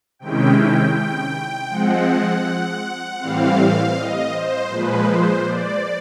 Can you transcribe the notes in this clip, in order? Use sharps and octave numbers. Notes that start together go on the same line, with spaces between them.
C3 D#3 G#3 C#4 E4 G5
G5
G5
F3 G#3 C4 F#5
A2 E3 G3 C4 F5
D#5
C5
A#2 F3 G#3 B4
C5
D5